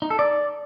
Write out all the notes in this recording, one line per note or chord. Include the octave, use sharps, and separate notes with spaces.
D#4
A4
D5